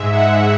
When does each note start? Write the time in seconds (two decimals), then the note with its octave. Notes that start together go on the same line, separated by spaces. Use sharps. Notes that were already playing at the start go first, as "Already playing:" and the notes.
Already playing: G#2 G#3 E5
0.12 F#5